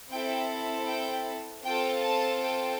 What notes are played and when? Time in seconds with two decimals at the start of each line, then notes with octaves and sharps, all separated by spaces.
0.11 C4 E4 A4 G5
0.88 G5
1.64 C4 F4 A4 G5
2.02 A5
2.41 G5